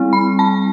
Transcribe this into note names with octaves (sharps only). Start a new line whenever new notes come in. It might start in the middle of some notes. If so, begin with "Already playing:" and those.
Already playing: G3 C4 E4
B5
A5